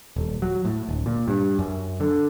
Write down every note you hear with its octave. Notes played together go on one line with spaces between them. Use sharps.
D#1
F#3
A2
D1
A#2
G2
F#2
D3